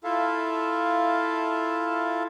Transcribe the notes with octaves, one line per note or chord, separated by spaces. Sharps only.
E4 F4 A4 E5 F5 A5